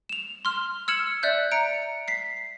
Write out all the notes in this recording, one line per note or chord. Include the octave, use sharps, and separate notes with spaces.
E7 F7
C6 F6
E6 F6 G#6 C#7 E7 F#7
D5 E5 F#6 G6
A#5 C#7 D7
B6 C7